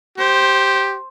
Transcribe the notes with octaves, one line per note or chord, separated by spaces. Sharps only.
G4 C5